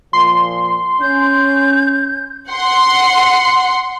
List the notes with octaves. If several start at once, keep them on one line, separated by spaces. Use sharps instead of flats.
A#2 F3 C6
C#4 G6
F#5 C6